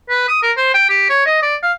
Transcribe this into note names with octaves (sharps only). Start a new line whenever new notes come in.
B4
D#6
A#4
C5
G5
G4
C#5
D#5
D5
F5